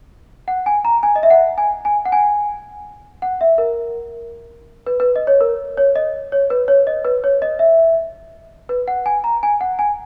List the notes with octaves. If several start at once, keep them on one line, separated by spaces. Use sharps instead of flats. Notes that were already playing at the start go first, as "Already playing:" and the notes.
F#5
G#5
A#5
G#5
D#5
E5
F#5
G#5
G#5
F#5
G#5
F#5
E5
A#4
B4
B4
D#5
C#5
A#4
C#5
D#5
C#5
B4
C#5
D#5
B4
C#5
D#5
E5
B4
F#5
G#5
A#5
G#5
F#5
G#5